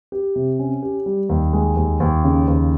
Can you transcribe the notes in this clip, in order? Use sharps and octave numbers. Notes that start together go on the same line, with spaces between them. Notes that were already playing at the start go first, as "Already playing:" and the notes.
G4
C3
C#4
G4
G3
D#2
G#3
D#2
D#2
C#3
D#2